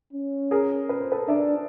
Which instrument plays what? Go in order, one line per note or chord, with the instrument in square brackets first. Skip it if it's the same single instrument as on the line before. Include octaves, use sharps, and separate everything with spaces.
[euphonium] C#4
[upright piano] G#4 A#4
B4
C5
A4 B4
[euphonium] D4 [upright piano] D5 E5